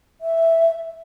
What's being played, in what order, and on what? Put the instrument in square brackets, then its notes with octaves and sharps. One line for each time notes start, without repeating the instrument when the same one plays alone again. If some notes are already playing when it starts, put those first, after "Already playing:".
[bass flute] E5